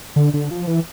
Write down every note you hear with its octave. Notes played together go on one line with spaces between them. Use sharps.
D3
D3
F3
E3